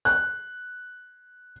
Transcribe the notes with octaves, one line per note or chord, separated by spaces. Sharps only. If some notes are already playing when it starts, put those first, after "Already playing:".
F#6